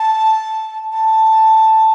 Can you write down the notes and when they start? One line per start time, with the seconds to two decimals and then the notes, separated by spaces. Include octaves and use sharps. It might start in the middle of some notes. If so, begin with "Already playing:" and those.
Already playing: A5
0.92 A5